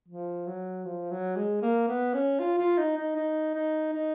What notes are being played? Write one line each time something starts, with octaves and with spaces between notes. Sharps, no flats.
F3
F#3
F3
F#3
G#3
A#3
B3
C#4
F4
F4
D#4
D#4
D#4
D#4
D#4